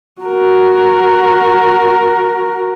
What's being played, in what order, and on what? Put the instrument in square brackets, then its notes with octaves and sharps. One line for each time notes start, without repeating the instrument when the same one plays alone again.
[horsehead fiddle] F#4 A#4